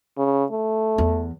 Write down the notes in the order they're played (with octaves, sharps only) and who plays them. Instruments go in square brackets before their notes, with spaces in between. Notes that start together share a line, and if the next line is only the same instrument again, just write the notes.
[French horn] C#3
A3
[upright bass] E2